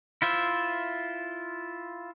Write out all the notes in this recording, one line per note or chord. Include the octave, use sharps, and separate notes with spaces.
E4 F4 C5 E5